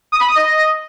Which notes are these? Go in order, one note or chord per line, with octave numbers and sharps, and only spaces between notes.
D#6
B5
D#6
D#5